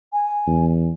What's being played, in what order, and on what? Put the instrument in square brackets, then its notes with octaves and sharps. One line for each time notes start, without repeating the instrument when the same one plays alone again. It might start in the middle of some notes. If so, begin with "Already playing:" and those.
[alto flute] G#5
[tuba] E2